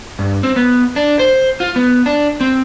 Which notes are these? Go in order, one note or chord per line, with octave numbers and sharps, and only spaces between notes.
G2
C4
B3
D4
C5
F4
B3
D4
C4